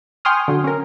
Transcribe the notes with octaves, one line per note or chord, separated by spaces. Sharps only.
G5 G#5 C6 C#6 D#6 F6
D3 F#3
C#4 A#4